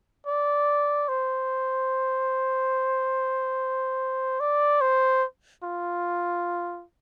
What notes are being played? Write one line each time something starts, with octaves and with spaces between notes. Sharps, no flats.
D5
C5
D5
C5
F4